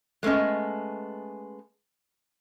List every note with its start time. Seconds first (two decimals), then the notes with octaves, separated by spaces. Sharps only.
0.23 G#3 A3 B3 C#4 D#5